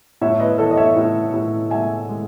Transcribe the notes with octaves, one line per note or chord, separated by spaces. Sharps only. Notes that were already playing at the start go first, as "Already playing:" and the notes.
A2 C#5 E5
B4 D#5
E3 A4 C#5
D#5
C#5 E5
A2
A2
G#3 E5 G#5
G#3